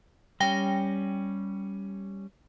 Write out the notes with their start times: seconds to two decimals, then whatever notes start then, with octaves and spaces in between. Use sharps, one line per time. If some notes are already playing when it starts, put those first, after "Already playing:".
0.40 G3 C#4 G5 A#6 G7